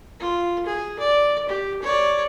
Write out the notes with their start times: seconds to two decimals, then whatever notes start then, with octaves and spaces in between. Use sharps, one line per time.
0.20 F4
0.66 G#4
0.99 D5
1.49 G4
1.82 C#5 D5